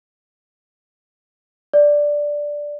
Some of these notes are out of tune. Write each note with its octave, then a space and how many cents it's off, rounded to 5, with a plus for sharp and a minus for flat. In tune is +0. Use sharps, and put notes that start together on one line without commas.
D5 +0